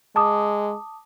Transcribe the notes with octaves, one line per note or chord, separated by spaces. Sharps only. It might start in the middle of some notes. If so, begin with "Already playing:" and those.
G#3 A5 D6 D#6